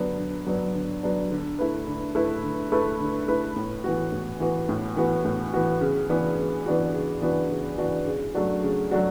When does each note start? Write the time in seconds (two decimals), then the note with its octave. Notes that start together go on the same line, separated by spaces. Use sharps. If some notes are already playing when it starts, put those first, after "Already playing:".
Already playing: D3 F#3 B3 D4
0.18 D3
0.47 F#3 B3 D4
0.74 D3
1.03 F#3 B3 D4
1.31 D3
1.59 A3 E4 B4
1.87 D3
2.15 A3 E4 B4
2.43 D3
2.72 A3 E4 B4
3.00 D3
3.28 A3 E4 B4
3.56 A2
3.84 E3 B3 F#4
4.12 A2
4.40 E3 B3 F#4
4.69 A2
4.96 E3 B3 F#4
5.25 A2
5.54 E3 B3 F#4
5.81 C#3
6.09 E3 B3 D4 F#4
6.37 C#3
6.66 E3 B3 D4 F#4
6.94 C#3
7.22 E3 B3 D4 F#4
7.50 C#3
7.78 E3 B3 D4 F#4
8.07 C#3
8.34 F#3 A3 D4 F#4
8.63 C#3
8.91 F#3 A3 D4 F#4